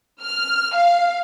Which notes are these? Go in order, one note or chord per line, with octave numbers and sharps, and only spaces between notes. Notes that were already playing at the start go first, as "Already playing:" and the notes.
F6
F5